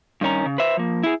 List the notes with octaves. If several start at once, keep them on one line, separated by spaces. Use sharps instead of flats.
G2 D#3 C#4 A#5
C#3
B4 C5 E5
F3 A#3
E4 G#4